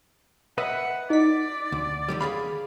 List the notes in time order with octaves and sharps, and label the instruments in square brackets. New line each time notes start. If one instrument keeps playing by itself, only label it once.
[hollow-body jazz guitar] B4 D#5 E5 [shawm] F#5
[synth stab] D#4 B6 [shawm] D5
[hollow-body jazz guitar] D2
D3 D#3 G3
[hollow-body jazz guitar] G#4 F5 [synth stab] B5